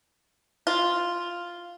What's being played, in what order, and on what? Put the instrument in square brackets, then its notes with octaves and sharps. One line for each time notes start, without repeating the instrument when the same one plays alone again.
[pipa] F4